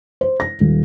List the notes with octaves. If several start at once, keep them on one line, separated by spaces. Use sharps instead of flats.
C5
A#6
D#1